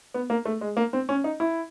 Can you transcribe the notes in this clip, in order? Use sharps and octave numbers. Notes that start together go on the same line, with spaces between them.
B3
A#3
A3
G#3
A#3
C4
C#4
D#4
E4